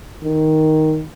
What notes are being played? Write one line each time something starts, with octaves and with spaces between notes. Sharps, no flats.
D#3